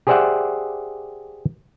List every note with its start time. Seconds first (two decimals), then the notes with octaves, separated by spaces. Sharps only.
0.07 G4 G#4 C5 D5 E5 F#5